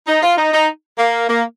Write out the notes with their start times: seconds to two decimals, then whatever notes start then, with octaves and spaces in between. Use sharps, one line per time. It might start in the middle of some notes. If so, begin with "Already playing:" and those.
0.07 D#4
0.23 F4
0.38 D#4
0.54 D#4
0.99 A#3
1.29 A#3